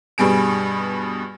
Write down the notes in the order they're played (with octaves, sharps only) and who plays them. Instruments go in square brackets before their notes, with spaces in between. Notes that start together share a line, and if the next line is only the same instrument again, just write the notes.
[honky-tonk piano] G2 B2 G3 G#4 D7